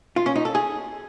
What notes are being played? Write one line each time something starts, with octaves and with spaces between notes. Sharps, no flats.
F4
C#4
D#4
A4
G#4